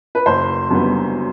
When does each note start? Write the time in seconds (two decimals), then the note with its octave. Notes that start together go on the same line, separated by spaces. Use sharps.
0.15 B4
0.26 F#1 C5
0.70 F#2 D3 G3 B3